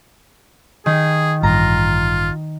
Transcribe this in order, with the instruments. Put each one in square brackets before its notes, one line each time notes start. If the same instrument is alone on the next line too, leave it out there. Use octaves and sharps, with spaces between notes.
[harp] D#3 [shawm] G#4
[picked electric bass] A1 G2 [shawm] F4 [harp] A#5